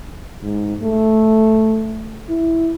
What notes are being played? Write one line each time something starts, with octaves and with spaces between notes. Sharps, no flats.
G#2
A3
E4